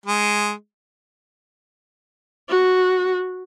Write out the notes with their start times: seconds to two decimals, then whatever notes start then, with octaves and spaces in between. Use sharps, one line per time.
0.06 G#3
2.49 F#4